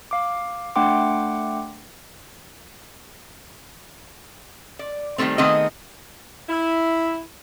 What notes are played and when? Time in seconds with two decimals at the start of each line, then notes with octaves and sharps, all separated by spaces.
0.11 F5 D6
0.76 A3 D4 F#5 G5 C6 D6
4.79 D5
5.18 D#3 F3 G3 A3 C4
5.38 D#3 A3 B3 C4 G#4 D#5
6.49 E4